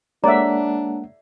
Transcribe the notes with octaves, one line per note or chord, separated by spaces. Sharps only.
G#3 A#3 D4 C#5 D5 E5 F#5 A#5